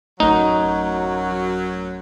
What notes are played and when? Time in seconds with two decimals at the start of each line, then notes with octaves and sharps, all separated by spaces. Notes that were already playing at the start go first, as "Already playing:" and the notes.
0.20 A1 F#2 F#3 A3 D#4